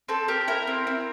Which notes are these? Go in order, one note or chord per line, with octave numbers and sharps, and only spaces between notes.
C4 A4
G4 A#4
E4 A#4
C4
C4